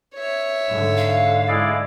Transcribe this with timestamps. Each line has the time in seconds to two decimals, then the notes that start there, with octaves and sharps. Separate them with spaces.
0.15 C#5 E5
0.68 G#2 D3
0.97 F5
1.48 G#3 E4 D5